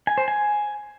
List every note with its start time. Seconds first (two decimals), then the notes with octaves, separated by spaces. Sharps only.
0.07 G#5
0.18 C5
0.28 G#5